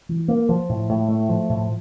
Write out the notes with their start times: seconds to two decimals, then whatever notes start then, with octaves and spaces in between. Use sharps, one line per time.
0.09 E3
0.28 A#3
0.49 F3
0.69 A2
0.89 A2
1.09 A3
1.29 F3
1.50 A2